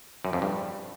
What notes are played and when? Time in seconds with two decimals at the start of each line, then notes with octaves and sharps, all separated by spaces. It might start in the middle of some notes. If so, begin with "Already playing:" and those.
0.25 F#2
0.33 F2
0.42 G2